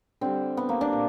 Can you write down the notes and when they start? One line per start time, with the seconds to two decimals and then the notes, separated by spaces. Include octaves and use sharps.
0.21 D3 G3 C4
0.57 B3
0.69 A#3
0.81 D4
0.93 A#2